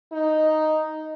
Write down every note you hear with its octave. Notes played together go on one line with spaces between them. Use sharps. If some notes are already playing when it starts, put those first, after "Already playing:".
D#4